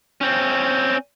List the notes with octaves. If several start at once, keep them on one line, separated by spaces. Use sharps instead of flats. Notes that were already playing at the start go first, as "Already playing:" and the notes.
C4 C#4